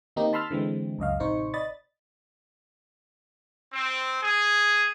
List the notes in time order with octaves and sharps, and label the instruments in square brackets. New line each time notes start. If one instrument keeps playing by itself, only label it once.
[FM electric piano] D#3 A#3 C4 D#4 G4
A5 B5 C6 E6 F6 A6
D3 E3 G#3 C4
C#2 F#2 D#5 F5
A1 C3 D#4 C5 C#6
D5 D#5 B5 A6
[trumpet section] C4
G#4